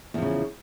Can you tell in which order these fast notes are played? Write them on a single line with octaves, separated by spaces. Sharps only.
E2 F3 C#3